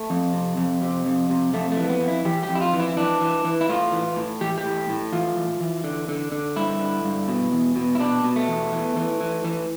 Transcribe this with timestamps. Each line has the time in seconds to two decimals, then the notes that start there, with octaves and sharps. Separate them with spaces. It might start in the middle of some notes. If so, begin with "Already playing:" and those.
Already playing: A3
0.10 F2
0.33 C3
0.57 F2
0.82 C3
1.05 F2
1.30 C3
1.54 F2 A3
1.72 A3
1.77 E3
1.84 A3
1.89 B3
2.01 F2
2.08 E4
2.25 E3 G4
2.43 G4
2.48 F2
2.55 E4
2.61 F4
2.73 E3
2.80 E4
2.96 E3 D4
3.21 E3
3.45 E3
3.61 E4
3.69 A2 F4
3.92 E3
4.16 A2
4.41 E3 G4
4.58 G4
4.64 A2
4.89 A2
5.12 E3 F4
5.36 E3
5.60 E3
5.84 D3
6.09 D3
6.32 D3
6.56 G2 E4
6.80 D3
7.04 G2
7.28 B2
7.52 E2
7.76 B2
7.95 E4
7.99 B2 D4
8.24 B2
8.36 A3
8.48 E2
8.72 E3
8.96 E3
9.21 E3
9.45 E3